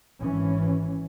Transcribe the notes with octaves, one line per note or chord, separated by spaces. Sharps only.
G#1 E3 C#4